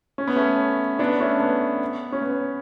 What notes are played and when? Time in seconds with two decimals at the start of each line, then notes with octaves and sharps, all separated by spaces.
0.18 C#4
0.27 B3
0.36 A3 C#4
0.99 B3 D4
1.20 A3 C#4
1.40 B3
2.12 C#4
2.22 B3